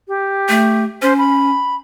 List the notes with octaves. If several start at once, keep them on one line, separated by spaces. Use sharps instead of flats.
G4
A3
C#4 C5
B5